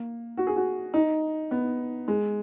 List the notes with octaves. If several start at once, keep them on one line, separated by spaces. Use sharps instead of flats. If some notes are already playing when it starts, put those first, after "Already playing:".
Already playing: A#3
F#4
G#4
F#4
D#4
B3
G#3